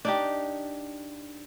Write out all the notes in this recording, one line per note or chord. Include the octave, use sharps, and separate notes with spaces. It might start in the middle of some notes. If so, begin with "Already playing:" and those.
D4 D#4 G4